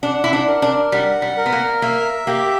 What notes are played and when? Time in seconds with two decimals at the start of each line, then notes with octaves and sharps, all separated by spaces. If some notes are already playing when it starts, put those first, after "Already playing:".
0.02 D4 F#5
0.24 E4
0.33 D4
0.48 A#4
0.62 D4
0.92 G3 F#5
1.22 G3
1.37 A#4
1.46 B3
1.52 A#3
1.82 A#3 E5
2.27 A#3 G4